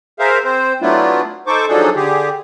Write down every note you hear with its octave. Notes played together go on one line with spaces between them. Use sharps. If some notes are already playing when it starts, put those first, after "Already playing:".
G#4 A#4 C5 E5 F5
C4 C5
F#3 A3 B3 D4 E4 F4
D#4 A4 C5 C#6 D6
D#3 F3 F#3 D4 G#4 A4
D3 G4 G#4